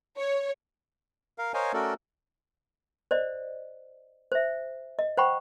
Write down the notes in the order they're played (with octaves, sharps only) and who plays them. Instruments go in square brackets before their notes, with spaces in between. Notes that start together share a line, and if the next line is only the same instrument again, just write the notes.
[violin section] C#5
[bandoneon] A#4 F5
A#4 C5 C#5 D#5 F5 G#5
A3 C#4 F#4 A4 A#4 D5
[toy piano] C5 D5 D#5
C5 E5
D#5
C5 F#5 G5 B5 C#6